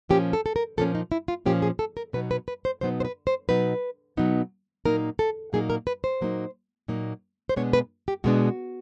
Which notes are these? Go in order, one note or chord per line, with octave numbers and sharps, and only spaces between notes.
A#2 F3 A#3 C#4 G4
A4
A4
A#4
A#2 F3 A#3 C#4 A4
D#4
E4
F4
A#2 F3 A#3 C#4 G4
G#4
A4
A#4
B2 F#3 B3 D#4 B4
B4
B4
C5
B2 F#3 B3 D#4 C5
C5
B4
C5
B2 F#3 B3 D#4 B4
B2 F#3 B3 D#4
A#2 F#3 A#3 D#4 A#4
A4
A#2 F#3 A#3 D#4 G#4
A#4
B4
C5
A#2 F#3 A#3 D#4
A#2 F#3 A#3 D#4
C5
B2 G#3 B3 D4 C#5
B4
G4
B2 G#3 B3 D4 F#4